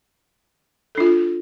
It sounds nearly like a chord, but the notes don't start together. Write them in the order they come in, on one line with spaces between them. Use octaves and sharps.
A4 D4 F4